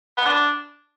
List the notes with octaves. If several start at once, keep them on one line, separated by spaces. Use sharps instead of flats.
B3
D4